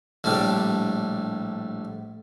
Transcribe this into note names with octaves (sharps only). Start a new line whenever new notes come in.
A#1 A2 G3 D4